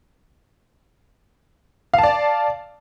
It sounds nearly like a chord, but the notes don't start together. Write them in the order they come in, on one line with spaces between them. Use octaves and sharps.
F5 A5 D5